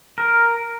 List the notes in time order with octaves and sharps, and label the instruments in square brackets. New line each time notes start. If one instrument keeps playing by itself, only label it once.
[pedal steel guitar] A#4